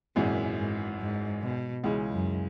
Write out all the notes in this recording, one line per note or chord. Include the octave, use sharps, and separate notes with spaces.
G#1 F#2 A#2 E3 G#3
G#2
G#2
B2
C#2 C#3 E3 G#3
F#2